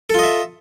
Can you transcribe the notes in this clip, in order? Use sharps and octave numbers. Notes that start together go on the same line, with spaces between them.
F4 A4 D#5 E5